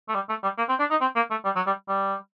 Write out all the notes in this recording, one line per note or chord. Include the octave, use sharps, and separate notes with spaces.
A3
G3
A3
G3
A#3
C4
D4
D#4
C4
A#3
A3
G3
F#3
G3
G3